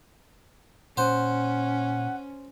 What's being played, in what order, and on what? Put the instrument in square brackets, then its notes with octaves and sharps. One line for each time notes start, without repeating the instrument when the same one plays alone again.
[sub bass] A#2 [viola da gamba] C#4 [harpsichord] C5 [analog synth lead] F#5